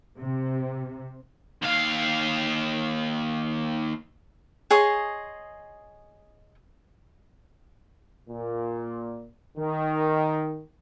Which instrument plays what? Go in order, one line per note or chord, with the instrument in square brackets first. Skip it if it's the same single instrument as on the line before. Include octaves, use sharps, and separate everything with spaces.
[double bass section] C3
[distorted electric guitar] D#2 F5
[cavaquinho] G#4 C#5 D#5 C6
[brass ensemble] A#2
D#3